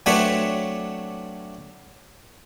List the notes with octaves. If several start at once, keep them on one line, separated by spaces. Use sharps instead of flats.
F#3 A3 C4 D4 B4 C#5